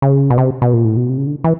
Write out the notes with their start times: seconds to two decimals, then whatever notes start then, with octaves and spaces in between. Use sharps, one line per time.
0.02 C#3
0.30 B2
0.38 C3
0.62 B2
0.73 A#2
0.85 A2
0.97 B2
1.09 C3
1.18 C#3
1.27 D3
1.44 E3